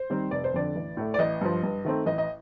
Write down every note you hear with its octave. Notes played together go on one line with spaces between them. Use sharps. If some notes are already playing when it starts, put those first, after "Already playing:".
Already playing: C5
D#3 G3 C4
F1 D5
C5
F2 D3 D5
A1
A2 A3
D5
A1 D#5
G2 F3
G2
D#3 A3 C4
A1 D#5
D#5